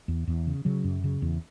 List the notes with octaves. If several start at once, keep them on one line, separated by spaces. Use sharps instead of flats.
E2
E2
C#3
C#3 F#3
F#2
C#3
E2